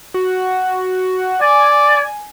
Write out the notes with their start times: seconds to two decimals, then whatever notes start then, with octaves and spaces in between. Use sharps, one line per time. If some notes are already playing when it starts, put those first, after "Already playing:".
0.14 F#4
1.41 D5 G#5